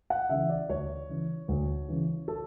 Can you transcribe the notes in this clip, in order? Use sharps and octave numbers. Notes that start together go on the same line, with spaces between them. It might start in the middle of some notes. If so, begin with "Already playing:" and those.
F#5
C#3 E3 E5
D5
D2 C#5
C#3 E3
D2
C#3 E3
A4